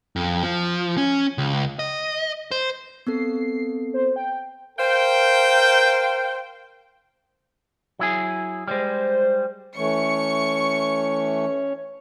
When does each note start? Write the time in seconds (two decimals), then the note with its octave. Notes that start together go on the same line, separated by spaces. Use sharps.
0.16 F2
0.43 F3
0.98 C#4
1.38 C#2
1.79 D#5
2.51 C5
3.07 B3 C4 A4 C7
3.94 C5
4.16 G5
4.79 A#4 C5 F5 G5
7.99 F#3 E4 G#4
8.68 G3 G#3 C5
9.77 E3 A3 C#4 C#5 C#6 C#7